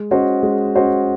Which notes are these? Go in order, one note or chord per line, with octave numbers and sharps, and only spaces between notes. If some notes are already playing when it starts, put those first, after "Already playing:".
Already playing: G#3
C#4 F#4 C5 D#5
G#3
C#4 F#4 C5 D#5